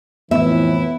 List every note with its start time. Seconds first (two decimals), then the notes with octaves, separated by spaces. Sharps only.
0.31 F2 A2 E3 B3 E4 E5